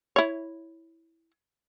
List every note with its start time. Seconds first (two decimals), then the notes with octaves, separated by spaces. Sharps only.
0.16 E4 C#5